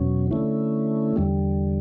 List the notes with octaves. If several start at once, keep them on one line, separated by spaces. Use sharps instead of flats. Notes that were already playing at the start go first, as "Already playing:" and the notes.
Already playing: E2 B2 F#3 C#4
D3 A3 C#4 E4
E2 D3 G3